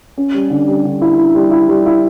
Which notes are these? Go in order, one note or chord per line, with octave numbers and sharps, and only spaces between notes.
C#4
G3
D3
G3
D3
E4
E4
G3
E4
G3
E4